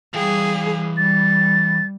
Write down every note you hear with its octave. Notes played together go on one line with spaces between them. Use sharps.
E3 G3 G#4 F5 G5
G3 A6